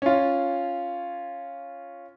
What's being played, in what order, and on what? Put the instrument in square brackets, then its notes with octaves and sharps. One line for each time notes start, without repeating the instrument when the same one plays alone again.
[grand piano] C#4 F4